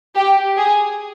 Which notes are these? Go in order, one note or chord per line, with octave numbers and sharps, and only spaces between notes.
G4
G#4